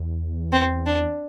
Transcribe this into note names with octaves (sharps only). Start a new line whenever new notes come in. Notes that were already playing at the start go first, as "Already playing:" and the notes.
Already playing: E2
C4
D4